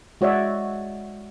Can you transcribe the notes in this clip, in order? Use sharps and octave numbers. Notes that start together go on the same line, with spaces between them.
G#3 F#4 C#5 D5 E5